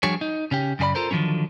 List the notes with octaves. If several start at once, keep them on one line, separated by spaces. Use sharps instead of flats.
F3 G3 D4 F#4 G#4 C#5
D#4
C#3 C#4 G4
F#2 C#3 G#4 D5 B5
F4 A4 A#4 C5
D3 D#3 F3 F#3 C#4